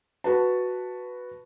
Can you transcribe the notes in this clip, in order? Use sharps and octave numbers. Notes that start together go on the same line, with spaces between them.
F#4 B4 A5